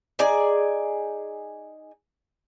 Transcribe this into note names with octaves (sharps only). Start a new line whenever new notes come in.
D#4 G#4 D5 G#5